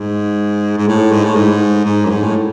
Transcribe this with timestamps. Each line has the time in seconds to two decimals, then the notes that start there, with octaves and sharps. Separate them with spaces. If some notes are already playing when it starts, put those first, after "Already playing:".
Already playing: G#2
0.78 G#2
0.88 A2
1.12 G#2
1.24 A2
1.35 G#2
1.85 G#2
2.05 F#2
2.10 G#2
2.23 A2